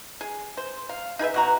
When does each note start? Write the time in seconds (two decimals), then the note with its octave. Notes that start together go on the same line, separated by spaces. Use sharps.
0.21 G#4
0.57 C5
0.89 F5
1.19 D#4 G#4 B4 E5
1.34 B2 F#4 A#5